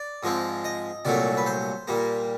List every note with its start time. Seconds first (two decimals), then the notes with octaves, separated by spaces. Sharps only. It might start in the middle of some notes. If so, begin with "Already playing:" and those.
Already playing: D5
0.23 G#2 F3 G#3 C4
0.64 D#5
1.05 C2 A#2 F#3 A3 D5
1.37 B4
1.46 C5
1.87 A#2 G3 A#3